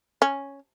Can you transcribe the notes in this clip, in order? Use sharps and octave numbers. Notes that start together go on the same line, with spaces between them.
C#4